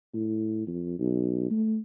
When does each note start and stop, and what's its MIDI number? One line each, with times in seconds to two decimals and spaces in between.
0.14 0.62 45
0.67 0.98 41
0.99 1.48 35
1.51 1.79 57